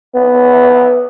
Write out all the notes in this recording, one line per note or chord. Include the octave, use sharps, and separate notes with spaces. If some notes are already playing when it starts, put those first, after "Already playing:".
B3